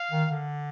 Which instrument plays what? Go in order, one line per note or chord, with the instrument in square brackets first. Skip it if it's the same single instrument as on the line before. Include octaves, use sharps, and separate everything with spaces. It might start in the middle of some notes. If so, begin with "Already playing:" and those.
Already playing: [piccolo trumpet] F5
[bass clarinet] D#3
D3